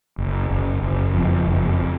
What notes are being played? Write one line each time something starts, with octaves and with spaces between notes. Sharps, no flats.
F#1
F#1
F#1
F2
F#1